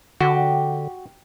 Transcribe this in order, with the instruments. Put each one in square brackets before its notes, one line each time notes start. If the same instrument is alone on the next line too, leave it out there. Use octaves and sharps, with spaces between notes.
[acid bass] D3 [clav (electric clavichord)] F#4 [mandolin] G4